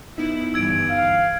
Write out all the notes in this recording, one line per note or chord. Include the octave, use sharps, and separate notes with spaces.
F#2 B3 D#4 E4
G2 D3 E3 E6 G#6 D7
F5